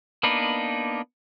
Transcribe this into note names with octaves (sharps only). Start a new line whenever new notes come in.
A#3 B3 D4 D#4 B4